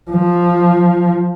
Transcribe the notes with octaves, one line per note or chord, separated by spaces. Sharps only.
F3